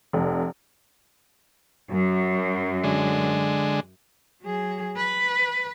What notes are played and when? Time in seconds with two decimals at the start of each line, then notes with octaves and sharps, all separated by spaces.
0.13 F1
1.90 F#2
2.84 D3 G#3
4.43 F#3 G#4
4.97 B4